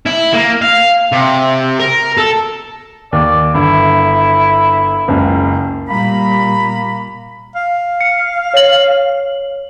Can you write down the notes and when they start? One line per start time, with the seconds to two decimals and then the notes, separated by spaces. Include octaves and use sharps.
0.06 E4
0.33 A#3
0.62 F5
1.12 C3
1.80 A#4
2.17 A4
3.13 D#2 D5
3.54 G1 E4
5.08 F#1 C#2
5.89 A#2 G3 A#3 A#5 B5
7.55 F5
8.00 C#7
8.54 C#5 F#7